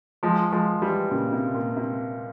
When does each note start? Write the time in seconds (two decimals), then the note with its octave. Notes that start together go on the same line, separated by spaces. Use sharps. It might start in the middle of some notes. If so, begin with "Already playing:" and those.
0.23 F3 G#3
0.52 F3 G#3
0.82 E3 G3
1.11 A#2 C#3
1.32 C3
1.54 A#2
1.77 C3